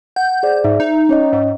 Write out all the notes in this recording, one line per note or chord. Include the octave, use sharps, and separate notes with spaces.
F#5 G6
G#4 C5 D5
G#2 E5
D#4
C#4 C#5 D#5
G#2